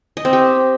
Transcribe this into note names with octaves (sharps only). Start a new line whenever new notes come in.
D#5
C4
G4